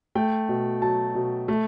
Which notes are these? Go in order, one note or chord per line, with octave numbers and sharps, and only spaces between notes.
A3 G5
B2
F#3 A5
B2
A3